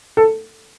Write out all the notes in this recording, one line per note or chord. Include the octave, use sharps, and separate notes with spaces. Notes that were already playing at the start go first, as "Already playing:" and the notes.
A4